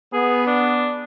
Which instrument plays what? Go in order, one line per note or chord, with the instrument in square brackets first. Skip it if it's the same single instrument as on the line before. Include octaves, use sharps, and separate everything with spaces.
[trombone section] B3 [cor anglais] G#4
[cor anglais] D4